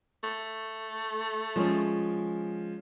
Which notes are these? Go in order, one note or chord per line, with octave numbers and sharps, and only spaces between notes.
A3
F3 G#3 C#4